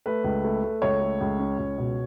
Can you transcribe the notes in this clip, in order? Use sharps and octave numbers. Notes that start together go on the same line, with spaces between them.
A3 B4
C#2
A3
A3
C#2 C#5
A3
C#2
C#4
C#2
B2